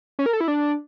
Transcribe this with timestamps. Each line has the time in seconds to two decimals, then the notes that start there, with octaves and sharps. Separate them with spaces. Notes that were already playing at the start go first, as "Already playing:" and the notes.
0.19 C#4
0.26 A#4
0.33 A4
0.41 E4
0.48 D4